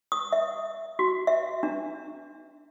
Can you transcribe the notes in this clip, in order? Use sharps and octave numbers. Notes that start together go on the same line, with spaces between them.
D#6
E5
F#4
E5
D4